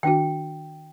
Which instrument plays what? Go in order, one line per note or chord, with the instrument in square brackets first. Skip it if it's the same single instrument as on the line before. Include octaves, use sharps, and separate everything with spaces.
[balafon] D#3 D4 F#4 [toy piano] G5